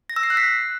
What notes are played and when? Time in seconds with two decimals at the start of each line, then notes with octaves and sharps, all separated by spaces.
0.10 A#6
0.16 E6
0.23 C7
0.30 F#6
0.37 B6